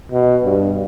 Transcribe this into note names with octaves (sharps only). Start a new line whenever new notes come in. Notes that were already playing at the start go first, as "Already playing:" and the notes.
B2
G2